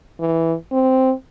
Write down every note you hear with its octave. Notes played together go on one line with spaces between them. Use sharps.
E3
C4